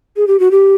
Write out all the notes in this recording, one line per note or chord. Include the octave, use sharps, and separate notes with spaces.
G#4
G4
F#4
G4